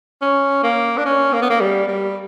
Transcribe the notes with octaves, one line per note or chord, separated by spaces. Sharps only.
C#4
A#3
D4
C#4
A#3
B3
A#3
G3
G3